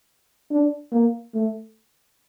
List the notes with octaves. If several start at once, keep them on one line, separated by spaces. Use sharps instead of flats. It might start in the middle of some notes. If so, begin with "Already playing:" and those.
D4
A#3
A3